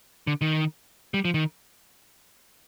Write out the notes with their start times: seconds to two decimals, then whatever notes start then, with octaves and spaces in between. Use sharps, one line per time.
0.27 D3
0.41 D#3
1.14 G3
1.25 F3
1.34 D#3